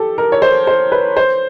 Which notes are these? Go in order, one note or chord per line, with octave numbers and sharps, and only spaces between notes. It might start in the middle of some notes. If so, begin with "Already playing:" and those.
Already playing: G4 A4
A#4
C#5
C5
C5
B4
C5